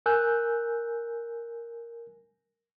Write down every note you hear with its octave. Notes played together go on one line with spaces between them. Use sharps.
A#4 G#5 E6 F#6 G6